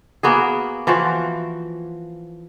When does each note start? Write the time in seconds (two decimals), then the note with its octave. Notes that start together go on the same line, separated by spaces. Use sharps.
0.23 A#3 B3 F#4 G#4
0.87 E3 F3 F#4 C5